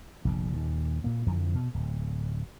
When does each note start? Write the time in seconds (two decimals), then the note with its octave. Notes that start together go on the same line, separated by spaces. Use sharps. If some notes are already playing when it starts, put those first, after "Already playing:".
0.25 F1 A#1 D3
0.53 D#2 A#2
1.04 A#2 A#3
1.27 F2 D3 E3 F3
1.55 B2
1.74 D1